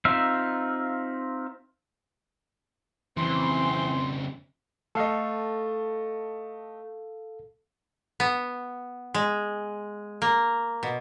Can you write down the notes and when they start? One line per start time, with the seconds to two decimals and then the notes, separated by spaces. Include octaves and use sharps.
0.05 C4 D#4 F4 E5 F5
3.17 F2 C#3 E3 C4 C6
4.95 A3 A4 D#5 F5
8.20 B3
9.14 G#3
10.22 A#3
10.83 B2